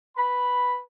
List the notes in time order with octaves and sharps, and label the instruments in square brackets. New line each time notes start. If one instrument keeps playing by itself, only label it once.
[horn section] B4 B5